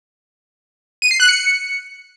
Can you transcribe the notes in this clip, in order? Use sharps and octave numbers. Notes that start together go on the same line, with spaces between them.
D#7
C7
F#6
C#7